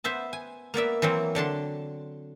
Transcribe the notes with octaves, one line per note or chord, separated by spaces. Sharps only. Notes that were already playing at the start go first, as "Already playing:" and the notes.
B3 C5 E5 A5
G#5
A#3 B3 D5 E5
E3 F#3 A#3 C4
D3 D4 A5 C6